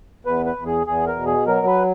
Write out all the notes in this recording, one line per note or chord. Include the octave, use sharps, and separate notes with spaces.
E2 B4
B4
E2
G#4
E2 G#4
A#4
B2
G#4
F#3 A#4
B4